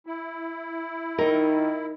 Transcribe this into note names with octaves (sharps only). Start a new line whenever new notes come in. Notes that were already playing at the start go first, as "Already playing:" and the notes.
E4
D#3 D#4 A#4